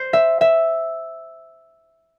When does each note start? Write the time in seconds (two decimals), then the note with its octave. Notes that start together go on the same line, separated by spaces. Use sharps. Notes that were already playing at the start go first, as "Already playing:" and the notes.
Already playing: C5
0.13 E5
0.41 E5